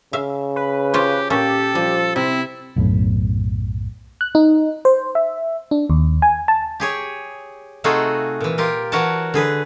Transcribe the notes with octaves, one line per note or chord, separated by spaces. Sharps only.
C#3 E5 F5
B4
F4 G4 C5 C#5
A#2 A#3 C#4 G4 A4
F3 G3
C3 C4 E4
B1 F#2 A2
F#6
D#4
C5
E5
D4
D#2
G#5
A5
G4 G#4 C#5
C3 A3 D#4 F4 F#4 G#4
A#2 E3
F4 G4 A#4
E3 F#4 A#4 C#5 F#5 A5
D3 G#4 B4